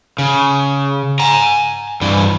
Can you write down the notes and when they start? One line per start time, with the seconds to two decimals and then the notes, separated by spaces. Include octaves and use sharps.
0.18 C#3
1.19 G#5 A#5
2.01 G2 E3